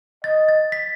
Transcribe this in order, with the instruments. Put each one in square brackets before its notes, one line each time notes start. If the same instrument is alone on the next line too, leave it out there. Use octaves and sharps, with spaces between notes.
[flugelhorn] D#5 [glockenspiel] A6
[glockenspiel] A6
B6